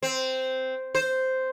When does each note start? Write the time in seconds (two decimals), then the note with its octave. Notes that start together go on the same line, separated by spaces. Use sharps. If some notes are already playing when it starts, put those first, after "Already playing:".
0.03 C4
0.95 C5